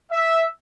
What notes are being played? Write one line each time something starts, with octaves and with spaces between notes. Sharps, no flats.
E5